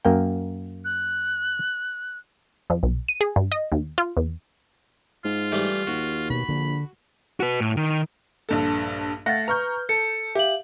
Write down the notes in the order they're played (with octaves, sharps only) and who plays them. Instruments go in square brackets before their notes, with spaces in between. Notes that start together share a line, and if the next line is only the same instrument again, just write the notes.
[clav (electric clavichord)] F#2 A#3 G5
[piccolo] F#6
[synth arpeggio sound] F2
B1
D#7
G#4
G2
D#5
D#2
F4
E2
[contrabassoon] G#2 [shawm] F4
[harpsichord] E3 G3 A3
[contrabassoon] D#2 [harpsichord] F#4
[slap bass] B2 [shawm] B5
[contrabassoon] A#1 [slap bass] D3
[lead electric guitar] F#4 B4
A2
D#3
[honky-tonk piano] A#1 G2 A4
[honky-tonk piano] A3 F5 F#5 [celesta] A6 A#6
[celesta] B4 F6 [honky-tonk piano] A#5 C#6 G6
[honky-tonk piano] A4 [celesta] C#7
[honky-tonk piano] G4 [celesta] E5 F5 F#7